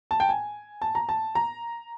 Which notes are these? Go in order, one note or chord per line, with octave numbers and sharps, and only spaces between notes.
A5
G5
G#5
A5
A#5
A5
A#5